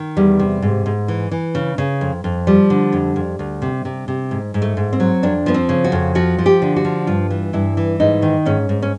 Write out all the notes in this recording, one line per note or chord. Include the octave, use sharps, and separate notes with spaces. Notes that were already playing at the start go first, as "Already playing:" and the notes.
Already playing: D#3
E2 G3
C3
G#2
G#2
E3
E3
C#3
C#3
F2
F2
F3 G3
D3
F2
F2
D2
C3
C3
C3
G#2
G#2
A3
G#2
C4
F#3
F2 D4
F3 B3
C4
C#3
F#4
F2
F3 F#4
F3
G4
D3
F#4
F3
G2 F4
E3
G2 E4
E3
G#2 D#4
D#3
G#2 C#4
G#2
C#4